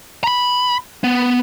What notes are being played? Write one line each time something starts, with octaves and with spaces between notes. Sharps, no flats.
A#5 B5
B3